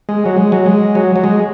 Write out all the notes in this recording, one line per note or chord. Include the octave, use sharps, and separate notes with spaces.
G#3
F#3
G#3
F#3
G#3
F#3
F#3
G#3